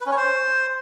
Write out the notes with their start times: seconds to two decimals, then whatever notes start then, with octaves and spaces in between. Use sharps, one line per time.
0.01 B4
0.06 C#4
0.12 C#5
0.17 C5